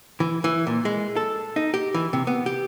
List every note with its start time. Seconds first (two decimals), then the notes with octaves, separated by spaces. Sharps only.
0.20 E3
0.44 E3
0.67 A#2
0.85 G#3
1.16 A4
1.56 D#4
1.74 G4
1.94 E3
2.13 C3
2.27 B3
2.46 G4